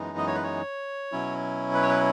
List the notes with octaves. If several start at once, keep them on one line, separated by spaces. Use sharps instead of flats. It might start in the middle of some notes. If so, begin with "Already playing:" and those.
Already playing: F#2 E3 G#3 B3 D#4
D#5
C#5
B4
C#5
B2 F#3 C#4 E4
B4
C#5
B4